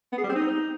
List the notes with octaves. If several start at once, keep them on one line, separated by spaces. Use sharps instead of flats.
B3
G#4
G3
C4
D#4